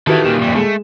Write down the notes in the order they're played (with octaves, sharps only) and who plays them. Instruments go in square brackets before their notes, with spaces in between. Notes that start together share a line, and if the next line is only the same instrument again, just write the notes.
[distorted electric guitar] D#3 [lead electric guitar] E3 A4 [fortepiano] F#4 [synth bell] G4 B4 E5
[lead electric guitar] D#2 A#2 [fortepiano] G4 [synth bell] E7
[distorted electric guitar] F2 G3
[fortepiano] G#3 [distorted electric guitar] A3